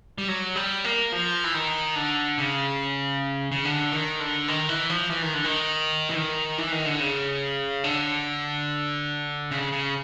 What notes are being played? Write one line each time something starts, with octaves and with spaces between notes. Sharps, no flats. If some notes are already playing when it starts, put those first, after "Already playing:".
G3
F#3
G3
A#3
F3
E3
D#3
D3
C#3
C#3
D3
D#3
D3
D#3
E3
F3
E3
D#3
D3
D#3
E3
D#3
E3
D#3
D3
C#3
D3
C#3
C#3